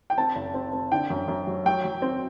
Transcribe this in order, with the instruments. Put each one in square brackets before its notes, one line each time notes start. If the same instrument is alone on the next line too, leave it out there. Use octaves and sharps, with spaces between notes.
[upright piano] G5
C4 A5
F#1
C4
C4
D3 G5
F#2
F#2
F#3
F#3 G5
F#3
C4